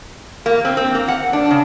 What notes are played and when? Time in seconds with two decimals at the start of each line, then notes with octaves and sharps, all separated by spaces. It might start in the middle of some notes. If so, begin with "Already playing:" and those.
0.46 A#3
0.65 C4
0.77 C4
0.95 A#3
1.08 F#5
1.33 D4
1.51 C#3